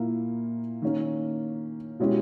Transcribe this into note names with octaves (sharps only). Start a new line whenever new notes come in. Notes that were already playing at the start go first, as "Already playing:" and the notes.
Already playing: A#2 A#3 E4
D#3 A#3 C#4
B2 G#3 C#4 E4 G4